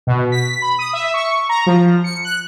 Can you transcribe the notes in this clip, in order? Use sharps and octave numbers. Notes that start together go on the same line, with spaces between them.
B2
B6
B5
D#6
E5
C#6
A#5
F3
C#7
F#6